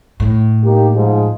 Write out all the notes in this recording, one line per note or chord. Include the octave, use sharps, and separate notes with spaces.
A2
A#3 D#4 G4
G#2 F3